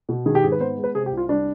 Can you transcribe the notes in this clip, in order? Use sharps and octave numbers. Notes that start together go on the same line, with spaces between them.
B2
D#3 G#4
G4
G#2 G#4
B4
B3 C5
G#3
B4
C3 G#4
G4
C2
F4
G3 D4